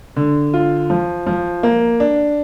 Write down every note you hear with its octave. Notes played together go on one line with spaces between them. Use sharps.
D3
F4
F3
F3
A#3
D4